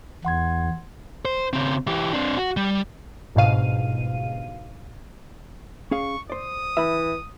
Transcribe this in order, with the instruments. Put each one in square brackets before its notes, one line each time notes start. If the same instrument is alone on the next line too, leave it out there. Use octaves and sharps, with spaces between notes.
[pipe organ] E2 [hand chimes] F#5 C6 G#6
[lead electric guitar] C5
C#3 C4
E3 G4
C4 D4
F#4
G3
[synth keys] G1 G#2 B2 F5 D#7
[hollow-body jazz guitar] C#4 G#4 F5 [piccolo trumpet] C#6
[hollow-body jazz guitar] C5 D5 [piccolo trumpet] D#6
[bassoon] E3 [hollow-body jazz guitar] E5 B5